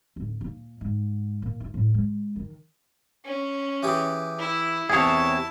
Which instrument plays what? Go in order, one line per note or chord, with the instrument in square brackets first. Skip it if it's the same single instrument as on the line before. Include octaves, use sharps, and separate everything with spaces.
[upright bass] D1
A#2
G#2
A#2
F4
A2
G#3
D#3
[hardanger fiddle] C#4
[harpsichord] E3 G4 G#4
[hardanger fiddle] E4
[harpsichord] E2 C3 [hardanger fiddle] E4 A5 [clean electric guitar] G#4 C#5